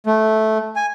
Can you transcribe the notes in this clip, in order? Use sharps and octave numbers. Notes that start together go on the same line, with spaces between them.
A3
G#5